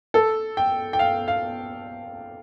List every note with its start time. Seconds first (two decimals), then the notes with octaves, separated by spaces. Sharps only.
0.14 A4
0.57 G5
0.93 G5
0.99 F5
1.28 F5